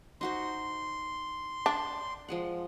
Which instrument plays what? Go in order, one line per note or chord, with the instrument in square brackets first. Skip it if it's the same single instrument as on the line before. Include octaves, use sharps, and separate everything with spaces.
[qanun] D#4 F#4 C5 [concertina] C6
[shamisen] D4 [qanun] G5 B5
[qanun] F3 G#3 F#5